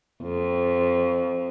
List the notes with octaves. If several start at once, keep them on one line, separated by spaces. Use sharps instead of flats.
F2